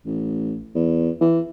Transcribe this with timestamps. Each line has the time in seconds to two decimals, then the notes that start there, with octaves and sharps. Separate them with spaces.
0.06 A1
0.75 E2
1.21 E3